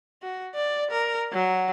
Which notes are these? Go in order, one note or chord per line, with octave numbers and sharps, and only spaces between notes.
F#4
D5
A#4
F#3